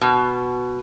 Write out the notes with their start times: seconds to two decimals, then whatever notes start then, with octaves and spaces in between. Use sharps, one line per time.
0.01 B2